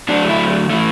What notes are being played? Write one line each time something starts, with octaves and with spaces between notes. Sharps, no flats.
D3 F#3 A3 D4
E4
A2 E3 A3